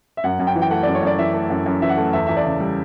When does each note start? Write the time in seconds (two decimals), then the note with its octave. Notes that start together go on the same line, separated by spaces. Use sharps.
0.17 E5
0.24 F#2 F#5
0.39 F#2
0.47 G5
0.56 E3
0.62 G5
0.70 A3 F#5
0.83 F#2 D5
0.95 C#5
1.03 F#2 D5
1.19 E3 E5
1.34 A3
1.50 F#2
1.66 F#2
1.82 E3 E5
1.89 F#5
1.98 A3
2.13 E2 E5
2.27 E2 E5
2.37 D5
2.45 C#3
2.60 G3